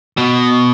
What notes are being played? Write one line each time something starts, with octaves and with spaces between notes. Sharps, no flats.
B2